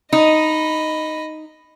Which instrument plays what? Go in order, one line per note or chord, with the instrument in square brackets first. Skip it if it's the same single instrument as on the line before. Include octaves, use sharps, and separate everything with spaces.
[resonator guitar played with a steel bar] D#4 [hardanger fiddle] D#5 B5